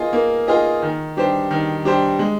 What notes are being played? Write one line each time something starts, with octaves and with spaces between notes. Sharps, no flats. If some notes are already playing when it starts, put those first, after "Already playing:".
Already playing: A#3 F4 G#4 D#5
A#3
F4 G#4 D#5
D#3
G3 D4 G4 C5
D#3
G3 D4 G4 C5
G#3